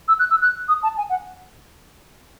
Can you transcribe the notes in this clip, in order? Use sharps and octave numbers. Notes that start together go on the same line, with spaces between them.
E6
F#6
E6
F#6
D#6
A5
G#5
F#5